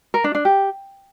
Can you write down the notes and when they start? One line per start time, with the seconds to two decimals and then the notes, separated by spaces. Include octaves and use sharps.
0.14 A#4
0.24 D4
0.35 D4
0.45 G4